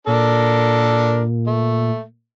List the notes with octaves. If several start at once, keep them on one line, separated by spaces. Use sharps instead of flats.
A#2 D4 A4 A#4
A3